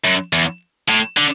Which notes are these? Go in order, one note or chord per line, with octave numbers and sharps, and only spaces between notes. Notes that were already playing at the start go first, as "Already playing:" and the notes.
F#2
E2
A2
D3